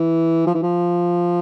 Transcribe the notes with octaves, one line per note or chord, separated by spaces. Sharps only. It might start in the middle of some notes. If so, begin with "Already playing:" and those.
Already playing: E3
F3
E3
F3